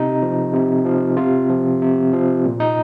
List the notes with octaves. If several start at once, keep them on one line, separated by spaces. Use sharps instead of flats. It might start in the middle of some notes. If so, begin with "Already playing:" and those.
Already playing: C3 D#4
F3
C3
F3
C3 F4
F3
C3
F3
A#2
D#4